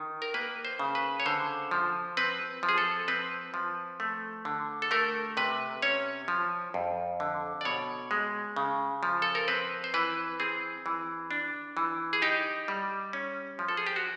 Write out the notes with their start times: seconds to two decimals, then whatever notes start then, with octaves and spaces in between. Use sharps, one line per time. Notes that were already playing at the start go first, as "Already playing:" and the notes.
Already playing: D#3
0.22 A#4
0.34 A#3 B4
0.65 C5
0.79 C#3
0.95 B4
1.20 C#5
1.26 D3 C5
1.71 F3
2.17 C4 B4
2.63 F3
2.69 G#4
2.78 A4
3.08 C4 B4
3.54 F3
4.00 A3
4.45 D3
4.82 A4
4.91 A3 A#4
5.37 C3 B4
5.82 C#4 C#5
6.28 F3
6.74 F2
7.20 D3
7.61 D5
7.65 B2 C#5
8.11 G#3
8.56 C#3
9.03 F3
9.22 A4
9.35 A#4
9.48 C4 B4
9.84 C5
9.94 E3 B4
10.40 C4 G#4
10.86 E3
11.31 D4
11.77 E3
12.13 G#4
12.22 D#4 G4
12.68 G3
13.13 C#4
13.59 F3
13.69 A4
13.77 G#4
13.87 G4
13.96 F#4